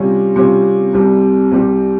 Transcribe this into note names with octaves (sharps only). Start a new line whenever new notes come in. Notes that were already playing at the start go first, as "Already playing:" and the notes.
Already playing: C3 G3 C#4 F4
C3 G3 C#4 F4
C2 C3 G3
C2 C3 G3